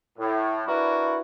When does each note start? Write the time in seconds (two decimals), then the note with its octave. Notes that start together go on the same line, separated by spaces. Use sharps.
0.19 A2
0.67 D4 E4 F#4 A#4 B4